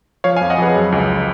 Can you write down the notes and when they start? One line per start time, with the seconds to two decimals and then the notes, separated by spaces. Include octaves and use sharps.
0.24 F3 C#5 F5
0.36 F5 G#5
0.41 F2
0.50 D#5 F#5
0.58 F2 G#4 B4
0.75 F#3
0.92 C#2